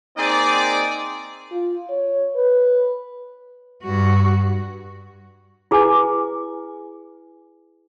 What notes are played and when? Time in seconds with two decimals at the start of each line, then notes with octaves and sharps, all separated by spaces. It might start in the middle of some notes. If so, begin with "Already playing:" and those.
0.17 A#3 C4 D#4 G#4 D5
1.52 F4
1.89 C#5
2.36 B4
3.83 G2 F#4
5.71 E4 G#4 B4 G#5 D6